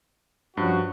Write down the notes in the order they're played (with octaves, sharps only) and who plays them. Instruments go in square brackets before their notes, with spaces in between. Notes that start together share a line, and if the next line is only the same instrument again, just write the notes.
[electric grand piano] G2 [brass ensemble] F3 C#4 F#4